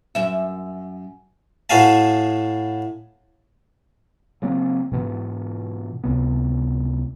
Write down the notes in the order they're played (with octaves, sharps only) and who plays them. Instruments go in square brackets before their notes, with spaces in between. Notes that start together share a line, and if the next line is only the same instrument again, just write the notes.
[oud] F#2 E5
[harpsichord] A2 F#4 G#4 F5 G#5 A5
[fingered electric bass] C#3 F#3 A#3 C4
G#2 B2 E3
C#2 A2 C3 B3